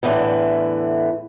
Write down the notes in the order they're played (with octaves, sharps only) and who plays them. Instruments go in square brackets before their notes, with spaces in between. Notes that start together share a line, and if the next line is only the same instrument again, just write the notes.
[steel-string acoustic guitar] E2 A2 D3 E3